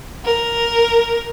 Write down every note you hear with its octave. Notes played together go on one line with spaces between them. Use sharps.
A#4